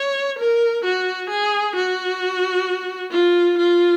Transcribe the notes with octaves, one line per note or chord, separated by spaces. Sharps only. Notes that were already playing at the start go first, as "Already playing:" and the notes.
Already playing: C#5
A#4
F#4
G#4
F#4
F4
F4